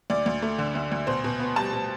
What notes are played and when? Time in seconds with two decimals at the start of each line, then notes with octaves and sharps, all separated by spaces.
0.10 D2 D5
0.26 D2
0.42 A3
0.58 D3
0.75 D2
0.91 D2
1.07 B2 C5
1.24 B2
1.40 B3
1.56 G3 A5
1.73 B2